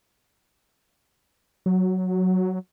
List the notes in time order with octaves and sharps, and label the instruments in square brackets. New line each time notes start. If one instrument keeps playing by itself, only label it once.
[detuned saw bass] F#3